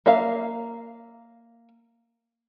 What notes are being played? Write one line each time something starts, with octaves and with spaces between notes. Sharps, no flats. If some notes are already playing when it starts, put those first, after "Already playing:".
A#3 E5 F5